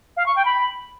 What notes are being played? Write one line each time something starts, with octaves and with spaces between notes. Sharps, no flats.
F5
C#6
G5
B5